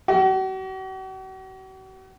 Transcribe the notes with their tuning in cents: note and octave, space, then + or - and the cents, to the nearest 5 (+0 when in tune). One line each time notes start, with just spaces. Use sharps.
F#4 +45